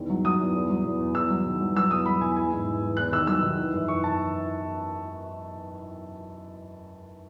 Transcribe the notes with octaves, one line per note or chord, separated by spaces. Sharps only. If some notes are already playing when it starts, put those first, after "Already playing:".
Already playing: E2 D#3
F#3
F#3 D#6
E2
E2
F#3
E2
E2
E2 E6
F#3
D#3
F#3
F#3 E6
E2 D#6
F#3 B5
E2 G#5
E3 G#5
G#2
E3
E3
E2 F#6
D#3 E6
F#3 E6
D#3
E3
F#2
E3 C#6
E3 A5